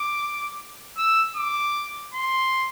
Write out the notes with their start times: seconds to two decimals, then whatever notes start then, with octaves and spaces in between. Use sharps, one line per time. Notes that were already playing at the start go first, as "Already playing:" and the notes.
Already playing: D6
0.98 E6
1.36 D6
2.14 C6